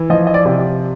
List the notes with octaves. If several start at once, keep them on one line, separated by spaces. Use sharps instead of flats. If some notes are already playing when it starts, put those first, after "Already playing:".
Already playing: E3
F3 D#5
D#5
D5
C3